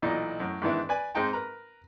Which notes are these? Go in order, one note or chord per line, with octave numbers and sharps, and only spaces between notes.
B1 A#2 E3 D#4 D5
F#2 A2
G#2 D#3 E3 B3 D4 E4
B4 D5 G#5
G#2 G#3 C4 D#4 G5 A5
A#4 B4 A#5